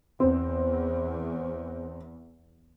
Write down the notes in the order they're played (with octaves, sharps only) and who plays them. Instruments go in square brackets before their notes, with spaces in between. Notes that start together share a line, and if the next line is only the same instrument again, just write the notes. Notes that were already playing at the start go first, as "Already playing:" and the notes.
[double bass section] E2 [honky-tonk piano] C4